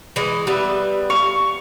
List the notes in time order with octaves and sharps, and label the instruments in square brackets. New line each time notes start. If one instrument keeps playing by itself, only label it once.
[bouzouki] E3 G#3
G3 B3 E5
[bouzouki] F5 [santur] C#6